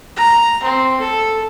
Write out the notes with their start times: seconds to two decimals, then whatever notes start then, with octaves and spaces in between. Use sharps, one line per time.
0.16 A#5
0.62 C4
1.00 A4